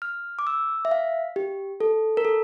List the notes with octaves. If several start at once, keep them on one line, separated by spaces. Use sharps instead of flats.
F6
D6
E6
E5
F5
G4
A4
A#4
A4